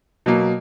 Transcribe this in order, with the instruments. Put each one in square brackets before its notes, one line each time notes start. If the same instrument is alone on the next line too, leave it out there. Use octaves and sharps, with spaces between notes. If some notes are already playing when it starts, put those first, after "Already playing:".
[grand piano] B2 F#3 A#3